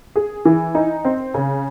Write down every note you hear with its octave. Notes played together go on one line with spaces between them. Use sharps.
G#4
E3
D#4
C4
C#3